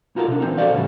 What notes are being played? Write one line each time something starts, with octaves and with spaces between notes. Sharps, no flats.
D#4 F4 F#4 A4 A#4
C3 D4
E3 C4 D#4
F#4 A4 C5 D5 F5
C#2 A2 C#3 G3